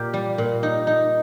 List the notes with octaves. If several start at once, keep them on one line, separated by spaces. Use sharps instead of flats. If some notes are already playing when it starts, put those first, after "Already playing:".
Already playing: A#2 A#3 G4
G3
A#2
D#4
D#4